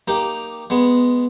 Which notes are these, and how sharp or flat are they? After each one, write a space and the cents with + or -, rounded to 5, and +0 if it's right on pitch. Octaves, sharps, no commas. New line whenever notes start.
A#3 +0 D#4 +0 G4 +0
G#3 +0 B3 +0